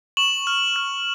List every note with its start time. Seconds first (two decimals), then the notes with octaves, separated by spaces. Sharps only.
0.17 C#6 E7 F#7
0.47 F6
0.76 F6